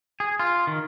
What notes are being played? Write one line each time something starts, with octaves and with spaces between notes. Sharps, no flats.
G#4
F4
D#3